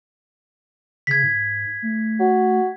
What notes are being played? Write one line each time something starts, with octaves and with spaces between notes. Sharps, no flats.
C#3 G#6 B6
G#2
A3
F#4